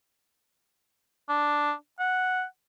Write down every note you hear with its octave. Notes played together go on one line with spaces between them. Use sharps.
D4
F#5